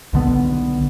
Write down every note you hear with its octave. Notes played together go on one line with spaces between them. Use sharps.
B1 D3 B3